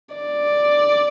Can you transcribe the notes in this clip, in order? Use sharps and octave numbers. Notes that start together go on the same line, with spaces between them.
D5